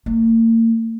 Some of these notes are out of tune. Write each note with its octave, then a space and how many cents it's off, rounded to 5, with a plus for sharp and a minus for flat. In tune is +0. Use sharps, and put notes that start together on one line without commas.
A#3 -40